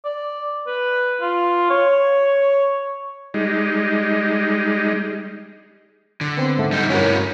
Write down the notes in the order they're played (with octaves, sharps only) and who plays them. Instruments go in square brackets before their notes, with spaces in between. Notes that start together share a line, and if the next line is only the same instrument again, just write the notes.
[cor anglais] D5
B4
F4
C#5
[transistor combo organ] G3 G#3 D#4
[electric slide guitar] D3
[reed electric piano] B3 C4
G#2 A3 F#5
[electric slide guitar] G3 D#4
[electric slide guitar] G2 E4 C#5 [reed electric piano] C#4 F#4 A#4